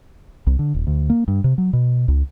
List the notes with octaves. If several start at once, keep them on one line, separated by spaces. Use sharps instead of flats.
C2
D3
D#1
D2
A#3
G2
C3
F#3
B2
C#2